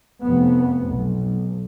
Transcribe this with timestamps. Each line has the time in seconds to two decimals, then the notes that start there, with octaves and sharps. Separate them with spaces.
0.22 F1 F2 B3
0.93 B1